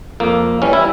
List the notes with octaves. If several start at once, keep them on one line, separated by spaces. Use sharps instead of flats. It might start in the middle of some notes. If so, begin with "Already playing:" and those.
F2 A#3
E3 G3 C#4
E4